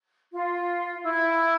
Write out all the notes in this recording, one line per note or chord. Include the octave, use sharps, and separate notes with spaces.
F4
E4